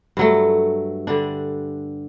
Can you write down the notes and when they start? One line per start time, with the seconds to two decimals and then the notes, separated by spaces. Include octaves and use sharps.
0.17 G2 F#3 A3
1.07 D3 G3 D4